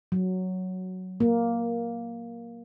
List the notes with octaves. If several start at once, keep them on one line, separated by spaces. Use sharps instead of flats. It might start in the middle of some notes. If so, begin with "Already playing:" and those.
F#3
A#3